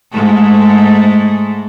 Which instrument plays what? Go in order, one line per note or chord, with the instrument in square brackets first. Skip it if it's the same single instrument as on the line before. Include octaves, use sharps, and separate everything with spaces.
[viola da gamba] G#2 G#3 A3